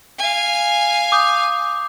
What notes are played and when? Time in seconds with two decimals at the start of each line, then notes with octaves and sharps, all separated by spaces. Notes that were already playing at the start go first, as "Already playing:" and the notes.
0.18 F5 G#5
1.12 D6 D#6 G6